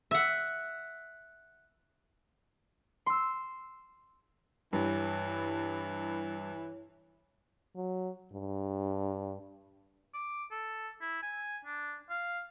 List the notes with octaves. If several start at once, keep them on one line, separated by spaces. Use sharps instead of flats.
E5 F#5
C6 E6
G2 E3 E4 C#5
F#3
G2
D6
A4
E4
G#5
D4
F5